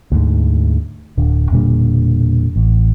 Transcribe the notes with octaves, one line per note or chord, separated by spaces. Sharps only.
D2 G#2
D1 D3
E1 A#2 D3 G3
A1